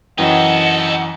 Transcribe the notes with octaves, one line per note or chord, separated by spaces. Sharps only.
F#2 E3 D#4 A4 D#5 F#5 G5